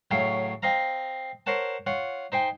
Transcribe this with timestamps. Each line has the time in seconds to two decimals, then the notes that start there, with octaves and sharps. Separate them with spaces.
0.11 A2 C#3 F#3 E4 F5
0.63 C4 D#5 F5 A#5
1.46 A#4 C5 C#5 F#5 A5
1.87 F4 C#5 F#5
2.32 D#4 C5 G5 G#5